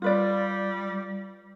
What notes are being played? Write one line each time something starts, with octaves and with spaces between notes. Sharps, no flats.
G3 F4 B4 D5